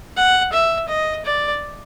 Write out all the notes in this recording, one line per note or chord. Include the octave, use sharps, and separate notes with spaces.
F#5
E5
D#5
D5